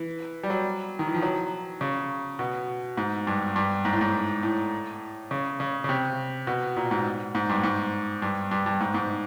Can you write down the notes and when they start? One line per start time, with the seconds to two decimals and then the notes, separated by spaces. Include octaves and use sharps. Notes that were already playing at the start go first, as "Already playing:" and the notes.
Already playing: E3
0.43 G3
0.50 F#3
0.99 D#3
1.08 E3
1.15 F3
1.22 F#3
1.81 C#3
2.39 B2
2.97 G#2
3.27 G2
3.56 G2
3.85 G#2
3.93 A2
4.01 G#2
4.43 A2
5.31 C#3
5.60 C#3
5.84 C#3
5.89 C3
6.47 B2
6.77 A#2
6.91 G#2
7.35 G#2
7.49 G2
7.63 G#2
8.22 G2
8.51 G2
8.66 G2
8.81 G#2
8.94 G#2